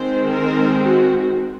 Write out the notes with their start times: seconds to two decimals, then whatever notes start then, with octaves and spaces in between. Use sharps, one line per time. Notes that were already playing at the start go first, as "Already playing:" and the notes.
Already playing: D#3 G#3 C4 C5
0.30 A#4
0.81 F#4